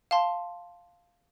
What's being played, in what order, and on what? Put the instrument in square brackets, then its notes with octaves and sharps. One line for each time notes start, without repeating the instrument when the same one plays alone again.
[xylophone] F5 A5 C6